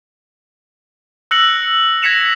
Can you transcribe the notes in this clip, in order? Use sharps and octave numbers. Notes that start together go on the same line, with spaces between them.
E6 F#6 A#6 C#7 F#7
G#6 A#6 B6 C#7 E7 F7